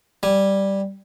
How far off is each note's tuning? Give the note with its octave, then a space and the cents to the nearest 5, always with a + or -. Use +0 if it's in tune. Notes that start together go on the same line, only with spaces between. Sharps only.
G3 +0 G#5 -15